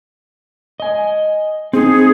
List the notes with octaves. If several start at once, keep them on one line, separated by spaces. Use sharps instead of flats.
D#5 G#5
C4 D#4 G#4